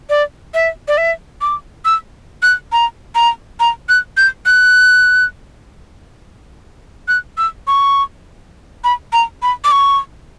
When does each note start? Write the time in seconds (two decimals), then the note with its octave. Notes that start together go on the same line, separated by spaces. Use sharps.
0.10 D5
0.54 E5
0.88 D5
0.98 E5
1.41 D6
1.85 E6
2.43 F#6
2.72 A#5
3.15 A#5
3.60 A#5
3.89 F#6
4.17 G6
4.46 F#6
7.08 F#6
7.38 E6
7.67 C#6
8.84 B5
9.13 A#5
9.42 B5
9.64 D6
9.71 C#6